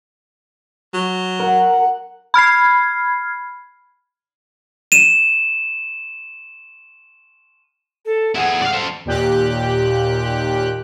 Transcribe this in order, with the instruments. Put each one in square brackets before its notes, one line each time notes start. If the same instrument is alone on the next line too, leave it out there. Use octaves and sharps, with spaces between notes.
[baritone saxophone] F#3
[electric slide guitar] A#4 [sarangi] F#5
[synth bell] B5 F6 G#6 C7
[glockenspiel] D#7 E7
[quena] A4
[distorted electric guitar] E4 G#4 [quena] F#5
[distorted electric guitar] D5 F5
A4 C5
[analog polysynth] D#2 A#2 G4 F#6